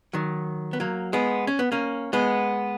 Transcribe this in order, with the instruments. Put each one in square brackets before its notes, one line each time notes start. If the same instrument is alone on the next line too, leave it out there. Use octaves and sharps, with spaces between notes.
[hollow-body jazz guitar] D#3 F#3
B3
F#3 A#3
G#3 B3
C#4
B3
A#3 C#4
G#3 B3